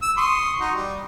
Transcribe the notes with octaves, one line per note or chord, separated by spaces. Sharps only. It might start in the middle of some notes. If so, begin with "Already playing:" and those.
E6
C6 C#6 D#6
D#4 F#4
G3